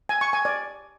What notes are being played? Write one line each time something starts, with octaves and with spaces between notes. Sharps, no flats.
G#5
C#6
G#5
D5